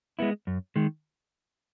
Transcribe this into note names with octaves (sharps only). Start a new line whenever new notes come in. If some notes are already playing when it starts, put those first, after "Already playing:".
G#3 B3 E4
F#2
D#3 G#3